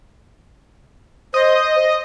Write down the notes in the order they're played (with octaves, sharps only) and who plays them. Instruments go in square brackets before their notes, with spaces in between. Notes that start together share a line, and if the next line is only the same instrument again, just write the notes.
[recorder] C5 [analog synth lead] D#5